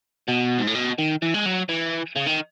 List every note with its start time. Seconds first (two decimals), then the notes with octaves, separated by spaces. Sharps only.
0.28 B2
0.58 G#2
0.67 A2
0.75 B2
0.98 D#3
1.22 E3
1.34 G#3
1.46 F#3
1.69 E3
2.17 C#3
2.27 D#3